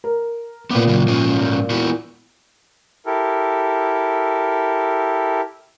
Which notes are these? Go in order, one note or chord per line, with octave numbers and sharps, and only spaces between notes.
A#4
A#2 B3 C4 B4 D6
C#3 F#3
G#2 F3 C#4
B3 E4 F#4
E4 G4 A4 A#4